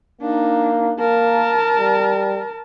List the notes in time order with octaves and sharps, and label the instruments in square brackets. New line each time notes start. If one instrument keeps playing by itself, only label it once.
[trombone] A#3 [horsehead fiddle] D4 D#4
[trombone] A#3 [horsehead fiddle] A#4 A5
[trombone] G3